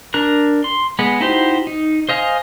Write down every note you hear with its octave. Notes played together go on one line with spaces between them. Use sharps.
D4 A#4 F#6
C6
G#3 B3
D#4 E4 F#4 G4 C5
D#4
C5 D#5 F5 G#5